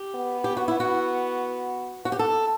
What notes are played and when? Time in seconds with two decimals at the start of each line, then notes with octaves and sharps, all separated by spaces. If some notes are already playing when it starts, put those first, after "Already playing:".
Already playing: G4
0.15 B3
0.44 G4
0.57 F#4
0.68 E4
0.80 F#4
2.05 F#4
2.12 G4
2.19 A4